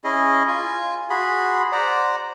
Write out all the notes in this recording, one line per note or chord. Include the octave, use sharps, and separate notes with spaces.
C#4 E4 G#4 D#5
F4 G#5
F#4 G#4 B5 C6
C5 D5 F#5 A#5